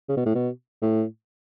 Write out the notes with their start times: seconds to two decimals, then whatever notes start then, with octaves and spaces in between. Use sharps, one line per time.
0.09 C#3
0.17 B2
0.26 A2
0.35 B2
0.82 A2